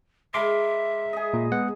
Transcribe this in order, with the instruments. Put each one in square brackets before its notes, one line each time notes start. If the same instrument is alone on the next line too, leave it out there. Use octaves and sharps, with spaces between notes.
[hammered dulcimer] G#3 A#4 B5 [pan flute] E5 [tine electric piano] C6 D6
[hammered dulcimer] G#4 D#5
[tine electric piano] A#2
G#3 B3 F#5